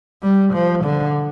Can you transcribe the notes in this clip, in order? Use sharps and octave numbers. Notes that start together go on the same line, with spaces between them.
G3
F3
D3